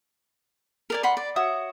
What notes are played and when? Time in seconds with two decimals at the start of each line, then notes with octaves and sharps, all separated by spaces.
0.90 A#4 D5 G#5
1.03 F#5 B5 C6
1.17 D5
1.36 F#4 C#5 E5 D#6